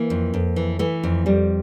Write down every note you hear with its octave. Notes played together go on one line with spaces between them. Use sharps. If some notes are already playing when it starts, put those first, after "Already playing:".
Already playing: E3 A#3
F2
F2
E3
E3 A3
F2
F2 G3